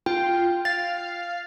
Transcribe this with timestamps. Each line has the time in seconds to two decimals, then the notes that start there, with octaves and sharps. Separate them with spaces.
0.06 F4 G5
0.65 F5 A6